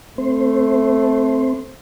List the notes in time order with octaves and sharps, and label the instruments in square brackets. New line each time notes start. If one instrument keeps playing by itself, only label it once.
[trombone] A3 [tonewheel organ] C4 C5